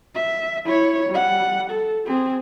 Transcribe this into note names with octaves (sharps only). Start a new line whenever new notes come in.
E5
E4 C#5
G3 F#5
A4
C4 G#4